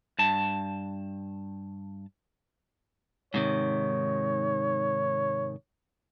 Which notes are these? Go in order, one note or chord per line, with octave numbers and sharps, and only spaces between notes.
G2 A5
G#2 C3 D#3 C#5